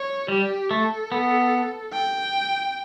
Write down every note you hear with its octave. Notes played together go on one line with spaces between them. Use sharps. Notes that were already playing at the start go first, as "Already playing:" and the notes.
Already playing: C#5
G3 G4
A3 A4
B3
G5